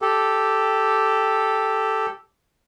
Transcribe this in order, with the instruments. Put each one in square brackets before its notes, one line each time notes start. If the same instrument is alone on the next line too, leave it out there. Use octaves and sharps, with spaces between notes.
[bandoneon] G4 A4